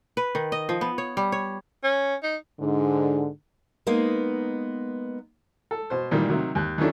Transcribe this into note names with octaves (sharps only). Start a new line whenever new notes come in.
B4
D#3
D#5
F3
B3
C#5
G3
C#5
C#4
D#4
G#2 D3
G#3 A#3 B3 D#4
A4
B2 C5
A#2 D#3 E3 G3
C3 D#3 F#3
D#2 F#6
D#3 E3 F#3 A3 C#4 D4